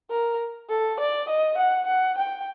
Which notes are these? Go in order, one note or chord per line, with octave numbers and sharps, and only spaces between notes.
A#4
A4
D5
D#5
F#5
F#5
G5